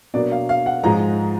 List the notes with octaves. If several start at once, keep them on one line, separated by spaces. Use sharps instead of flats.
B2 F#3 A#3 D4 D5
F5
F5
F#5
G#2 F3 G#3 A#5